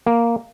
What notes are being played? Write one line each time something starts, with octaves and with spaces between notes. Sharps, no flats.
A#3